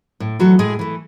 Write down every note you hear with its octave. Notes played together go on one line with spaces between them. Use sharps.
A2
E3 F#3 A3 F#4
A2 G#3 G#4
E3 A3